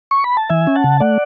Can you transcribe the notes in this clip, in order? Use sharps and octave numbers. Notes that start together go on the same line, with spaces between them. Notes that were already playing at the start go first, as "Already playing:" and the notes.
C#6
B5
A5
E3 E5 G#5
C#4
F#5 A5
C#3
A3 D5 F#5